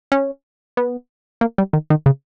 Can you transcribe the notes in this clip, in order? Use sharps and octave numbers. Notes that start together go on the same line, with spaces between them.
C#4
B3
A#3
G3
D#3
D#3
C#3